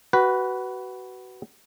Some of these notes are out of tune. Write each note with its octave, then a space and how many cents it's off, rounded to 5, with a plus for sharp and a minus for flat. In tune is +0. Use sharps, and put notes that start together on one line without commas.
F#4 +20 B4 +0